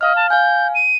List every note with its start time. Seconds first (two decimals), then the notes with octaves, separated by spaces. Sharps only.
0.01 D#5 F5 F6
0.16 A5
0.30 F5 G#5 G6
0.75 D#7